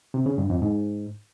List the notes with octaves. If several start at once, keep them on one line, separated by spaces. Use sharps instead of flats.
C3
C#3
G2
F2
G#2